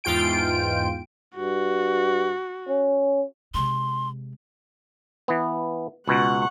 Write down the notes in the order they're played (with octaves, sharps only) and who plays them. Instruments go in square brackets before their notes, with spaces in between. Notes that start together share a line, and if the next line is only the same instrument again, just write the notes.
[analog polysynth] E2 G#2 F4 G5 D7
[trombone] G2 [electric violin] F#4
[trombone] C#4
[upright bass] C3 G#3 [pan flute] C6
[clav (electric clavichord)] E3 B3
[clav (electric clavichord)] C#2 B2 [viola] F#5 C#6